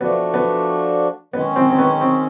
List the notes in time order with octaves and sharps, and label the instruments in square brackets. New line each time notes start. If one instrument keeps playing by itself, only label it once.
[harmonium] F3 A3 D4 F#4 [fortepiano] B3
[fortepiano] B3
[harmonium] D#3 G#3 C#4 [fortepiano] B3
[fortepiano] C4
C4
B3
C4